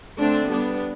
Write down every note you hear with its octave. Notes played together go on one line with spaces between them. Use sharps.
D3 A3 C4 D4
G3 B3 D4